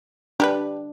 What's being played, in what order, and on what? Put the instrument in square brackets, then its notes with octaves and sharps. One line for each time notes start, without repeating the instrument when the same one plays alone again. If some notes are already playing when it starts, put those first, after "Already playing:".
[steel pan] D4 [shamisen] G4 A#4 B4